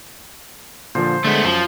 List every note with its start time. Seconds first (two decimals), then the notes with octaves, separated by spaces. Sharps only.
0.95 A#2 D3 F3 C5
1.24 D3 G#3 A3 B3
1.45 F#2 F3